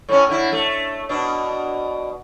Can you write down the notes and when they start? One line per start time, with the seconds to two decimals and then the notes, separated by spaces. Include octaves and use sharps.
0.09 A2 C#4
0.29 D3 E4
0.53 A3
1.09 B2 D4